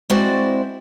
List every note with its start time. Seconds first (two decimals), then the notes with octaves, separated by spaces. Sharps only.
0.10 G#3 C4 E4 F#4 C5 D5